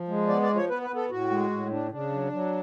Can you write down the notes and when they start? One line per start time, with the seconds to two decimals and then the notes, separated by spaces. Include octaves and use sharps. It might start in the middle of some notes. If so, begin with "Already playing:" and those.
Already playing: F3
0.08 G#3
0.28 B3 D5
0.42 D5
0.49 F3
0.56 C#5
0.69 B3 B4
0.82 B4
0.90 B3
0.96 A4
1.10 A2 F#4
1.30 G#3
1.51 A2
1.71 D4
1.91 C#3 D4
2.12 F#3
2.32 F#3